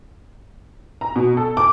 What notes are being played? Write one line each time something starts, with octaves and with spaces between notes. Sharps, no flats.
A#5
B2
A4
D6